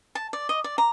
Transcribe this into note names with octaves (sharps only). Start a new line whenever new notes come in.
A5
D5
D#5
D5
A#5